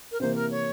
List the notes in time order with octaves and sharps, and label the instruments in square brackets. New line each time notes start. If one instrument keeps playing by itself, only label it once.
[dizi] A#4
[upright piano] C3 E3 A#3 [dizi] C5
[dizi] A#4
C#5